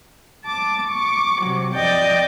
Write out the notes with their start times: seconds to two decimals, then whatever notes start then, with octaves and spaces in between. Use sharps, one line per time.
0.44 A5 D6
0.88 C#6 D6
1.41 C3 F#3
1.75 F2 D5 D#5 G5 D6 G6